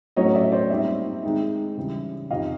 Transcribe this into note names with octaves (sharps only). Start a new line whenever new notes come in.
A2 F#3 A3 C#4 C#5 D#5
D5 E5
C5 D5
A#2 G3 C4 D#4 D5 E5
D#3 G#3 C4 D#4
C#3 E3 G3
F2 C3 D#3 D#5 F5